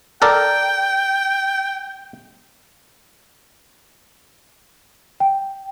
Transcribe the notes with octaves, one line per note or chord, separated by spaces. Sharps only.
A4 A#4 D5 G5
G5